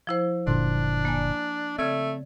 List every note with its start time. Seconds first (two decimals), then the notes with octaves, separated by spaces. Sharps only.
0.07 F3 E4 C5
0.47 F#1 A#2 D3 D4 C6
1.05 A#3 D5 G#5
1.78 C#3 A3 C4 D5 G#6